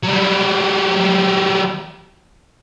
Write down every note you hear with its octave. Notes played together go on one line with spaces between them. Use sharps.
F#3 G3